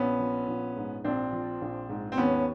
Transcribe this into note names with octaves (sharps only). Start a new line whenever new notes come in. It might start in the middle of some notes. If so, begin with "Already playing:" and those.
Already playing: A#1 B3 C#4
F3
A#1
G#2
A#1 C4 D4
F3
A#1
G#2
C4
D#2 B3 C#4